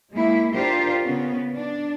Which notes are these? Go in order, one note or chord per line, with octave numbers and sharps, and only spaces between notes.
G#3 A#3 E4
D4 F4 G4 A#4 C5
C#3 B3 C#4
D4